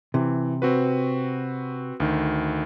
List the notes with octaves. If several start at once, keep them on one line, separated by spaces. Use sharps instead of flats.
C3 E3
C4 F#4 B4
D2 D#3